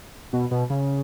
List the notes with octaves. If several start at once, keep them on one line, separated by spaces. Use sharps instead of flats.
B2
B2
C#3